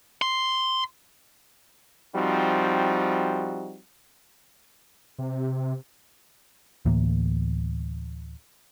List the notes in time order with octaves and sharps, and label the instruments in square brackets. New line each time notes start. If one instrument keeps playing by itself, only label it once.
[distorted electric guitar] C6
[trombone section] F3 G3 C4 D#4 F#4
[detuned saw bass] C3
[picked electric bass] D2 A2 E3 A#3